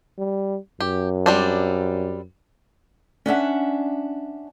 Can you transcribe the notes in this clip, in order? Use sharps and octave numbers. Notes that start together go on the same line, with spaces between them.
G3
F#2 G4
G3 C4 D4
C#4 D4 E5 F#5